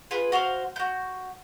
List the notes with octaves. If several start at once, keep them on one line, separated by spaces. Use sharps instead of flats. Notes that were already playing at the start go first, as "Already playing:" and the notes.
F4 G#4 B4
F#4 C5 F5 F6
F#4 G6